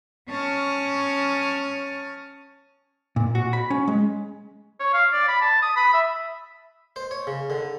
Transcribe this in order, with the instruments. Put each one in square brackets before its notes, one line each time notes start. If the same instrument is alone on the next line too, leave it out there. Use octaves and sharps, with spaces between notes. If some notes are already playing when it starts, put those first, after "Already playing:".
[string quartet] C#4 A5 C#6 D#6 F6
[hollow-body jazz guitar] A#2
F#4
B5
C#4
G#3
[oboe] C#5
F5
D5
B5
A5
D#6
B5
E5
[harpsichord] C5
C#5
C#3
D3